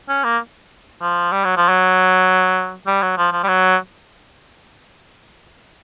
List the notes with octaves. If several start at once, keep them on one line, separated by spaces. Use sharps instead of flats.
C#4
A#3
F3
G3
F#3
F3
F#3
G3
F#3
F3
F3
G3
F#3